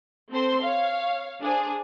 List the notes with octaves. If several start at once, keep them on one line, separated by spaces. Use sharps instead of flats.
C4 A4 C5 C6
C#5 F5
D4 G#4 C5